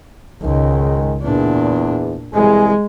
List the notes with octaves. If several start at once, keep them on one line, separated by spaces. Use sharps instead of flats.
C#2 G#2 D#3 G#3
E2 A#2 D4
C2 E3 G#3 G#4